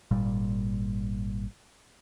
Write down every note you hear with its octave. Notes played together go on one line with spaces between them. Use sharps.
G#1 A#2 G3